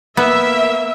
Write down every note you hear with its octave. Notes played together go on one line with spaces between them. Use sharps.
A#3 B3 E5